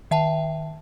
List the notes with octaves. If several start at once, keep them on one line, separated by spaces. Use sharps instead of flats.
D#3 E5 G5 A5